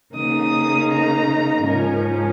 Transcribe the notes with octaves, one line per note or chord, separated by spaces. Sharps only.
C#3 A#3 D#4 D#6
A#5
G#2 F3 C#4 A#4